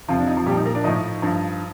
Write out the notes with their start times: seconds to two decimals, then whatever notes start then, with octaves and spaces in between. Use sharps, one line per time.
0.08 F2 C3 F3 F4
0.18 D4
0.27 D#4
0.37 F3 F4
0.46 A#2 G3 G4
0.51 F3 D#4
0.65 A#3 A#4
0.75 D4 D5
0.84 A2 F3 D#4 D#5
1.22 G2 F3